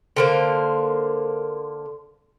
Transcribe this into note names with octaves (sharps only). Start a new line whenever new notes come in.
D3 A#3 C5